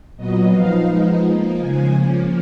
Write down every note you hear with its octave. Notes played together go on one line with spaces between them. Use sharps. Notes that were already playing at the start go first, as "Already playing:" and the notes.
A#2 F#3 B3 D#5
F3 B3 D#4 F5
F3 G#3 B3 D#4
F3 A#3 D#4
C#3 F3 G#3 G#5
F3 A#3 C#4